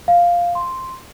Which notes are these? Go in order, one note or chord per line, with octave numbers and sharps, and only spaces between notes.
F5
C6